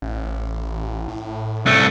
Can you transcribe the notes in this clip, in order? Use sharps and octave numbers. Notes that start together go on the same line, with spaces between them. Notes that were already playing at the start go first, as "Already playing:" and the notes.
A1
A2
C2 A3